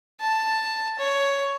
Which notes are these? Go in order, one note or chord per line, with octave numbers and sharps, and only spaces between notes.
A5
C#5